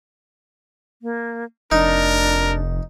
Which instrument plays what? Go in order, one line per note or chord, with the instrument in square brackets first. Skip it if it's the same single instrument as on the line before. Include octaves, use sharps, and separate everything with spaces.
[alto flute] A#3
[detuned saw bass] F1 [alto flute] D4 [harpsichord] D#4 [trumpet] A#4